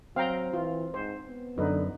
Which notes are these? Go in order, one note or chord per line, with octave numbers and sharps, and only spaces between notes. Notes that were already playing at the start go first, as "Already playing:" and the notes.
F#3 C4 F5 G5 A#5
E3 F4
G#2 C5
B3
F#2 D3 D#4 B4